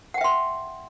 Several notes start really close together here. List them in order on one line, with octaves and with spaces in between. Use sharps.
F#5 G5 E5 C6